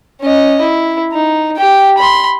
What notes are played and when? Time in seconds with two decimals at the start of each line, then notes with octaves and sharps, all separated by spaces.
0.22 C#4 D#5
0.62 E4
1.13 D#4
1.57 G4 G5
1.97 B5 C6